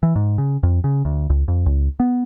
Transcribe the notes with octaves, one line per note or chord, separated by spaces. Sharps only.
E3
G#2
C#3
F2
C#3
D2
C#2
F2
C#2
B3